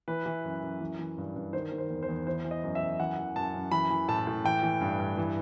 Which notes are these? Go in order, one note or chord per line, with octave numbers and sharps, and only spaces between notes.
E3 B4
E3
F#2
F#2
E3
E3
G2
G2
D#3 C5
D#3
C5
E2
C5
E2
E3 C5
E3
D#5
F#2
E5
F#2
E3 F#5
E3
F#2 A5
F#2
E3 B5
E3
A2 A5
A2
E3 G5
E3
G2
G2
E3